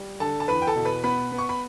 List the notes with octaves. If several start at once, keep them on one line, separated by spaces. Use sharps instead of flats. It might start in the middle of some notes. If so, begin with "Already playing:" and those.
Already playing: G3
D3 A4 A5
A5
E2 B4 B5
G5
A4 A5
B2
B4 B5
B3 B4 B5
B3
C#6
B5